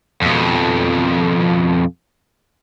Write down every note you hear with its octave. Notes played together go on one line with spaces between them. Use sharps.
F2 B2